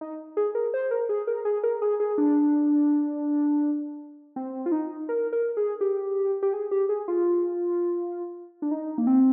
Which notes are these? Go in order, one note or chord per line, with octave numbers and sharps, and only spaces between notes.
D#4
G#4
A#4
C5
A#4
G#4
A#4
G#4
A#4
G#4
G#4
D4
C4
F4
D#4
A#4
A#4
G#4
G4
G4
G#4
G4
G#4
F4
D4
D#4
A#3
C4